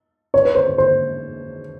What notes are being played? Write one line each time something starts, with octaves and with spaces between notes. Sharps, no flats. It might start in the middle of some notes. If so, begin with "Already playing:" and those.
C#5
B4
C5
C5
C5